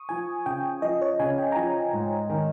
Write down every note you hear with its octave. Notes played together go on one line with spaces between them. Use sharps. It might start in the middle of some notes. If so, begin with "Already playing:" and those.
Already playing: C#6 D#6
F3 G#5
C#3 G5
F3 D#5
C#5
C#3 G#5
G5
A#5
F3 G#5
G#2
D#3